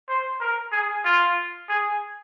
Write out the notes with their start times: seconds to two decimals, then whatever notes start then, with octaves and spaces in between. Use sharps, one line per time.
0.09 C5
0.40 A#4
0.72 G#4
1.05 F4
1.69 G#4